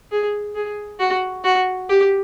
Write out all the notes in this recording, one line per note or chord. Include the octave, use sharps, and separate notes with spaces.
G#4
G#4
F#4
F#4
G4